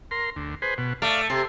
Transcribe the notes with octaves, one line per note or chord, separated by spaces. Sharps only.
A#4 C6
D2
G#4 B4 C5
B2
A3 D5 F5
C3 C6